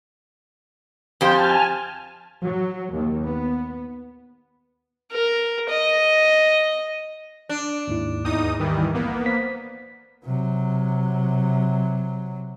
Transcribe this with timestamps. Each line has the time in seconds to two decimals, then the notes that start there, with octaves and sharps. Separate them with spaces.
1.21 F2 G4 C5 G#5 A5 F6
2.45 F#3
2.93 D#2
3.27 B3
5.12 A#4
5.70 D#5
7.49 D4
7.87 D#2 G#2 E4
8.24 E2 D#4 D#6
8.59 D#3 E3 G3
8.94 A#1 A#3 B3
9.26 C5 B6
10.25 C3 F#3